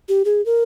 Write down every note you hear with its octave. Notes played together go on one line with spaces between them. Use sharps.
G4
G#4
A#4